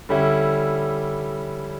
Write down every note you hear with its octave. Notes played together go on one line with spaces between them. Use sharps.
D3 G3 C#4 E4